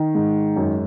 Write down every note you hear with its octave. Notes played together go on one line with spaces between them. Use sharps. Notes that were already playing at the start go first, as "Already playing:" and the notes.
Already playing: D#3
G#2
F#2